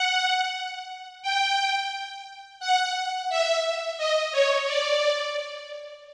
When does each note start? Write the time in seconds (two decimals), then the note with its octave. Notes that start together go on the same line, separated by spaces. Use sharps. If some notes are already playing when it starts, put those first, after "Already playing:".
Already playing: F#5
1.22 G5
2.60 F#5
3.30 E5
3.98 D#5
4.32 C#5
4.66 D5